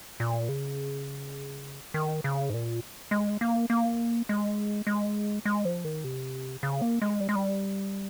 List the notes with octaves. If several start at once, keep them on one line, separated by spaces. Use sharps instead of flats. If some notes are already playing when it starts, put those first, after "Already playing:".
A#2
C#3
D#3
C#3
G#2
A#2
G#3
A#3
A#3
G#3
G#3
G#3
F3
D#3
C3
C#3
A#3
G#3
G3
G#3
G3